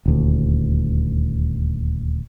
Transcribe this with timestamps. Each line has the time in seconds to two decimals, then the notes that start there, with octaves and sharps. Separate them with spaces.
0.05 D#1 D2